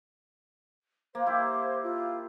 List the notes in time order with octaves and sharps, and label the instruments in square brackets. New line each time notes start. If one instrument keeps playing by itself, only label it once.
[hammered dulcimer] A#3 [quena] C5
[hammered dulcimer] E4 G4
[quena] F4